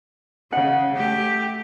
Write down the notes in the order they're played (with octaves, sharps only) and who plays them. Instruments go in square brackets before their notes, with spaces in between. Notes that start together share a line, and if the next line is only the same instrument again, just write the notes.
[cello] C#3 [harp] F#5
[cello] A3 G4